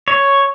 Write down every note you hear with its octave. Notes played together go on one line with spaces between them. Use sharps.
C#5